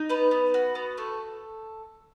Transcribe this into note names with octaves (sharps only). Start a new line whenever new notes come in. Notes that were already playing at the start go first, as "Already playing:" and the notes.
Already playing: D#4
B3 B4
B3
F#4
B3
A3 A4